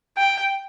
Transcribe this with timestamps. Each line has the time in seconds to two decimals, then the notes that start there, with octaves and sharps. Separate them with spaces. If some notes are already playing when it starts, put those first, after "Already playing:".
0.17 G5